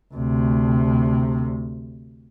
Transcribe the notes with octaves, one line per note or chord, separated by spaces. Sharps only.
D2 C3